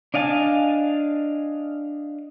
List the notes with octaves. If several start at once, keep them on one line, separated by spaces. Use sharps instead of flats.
D4 D#5 F5 G#5 A5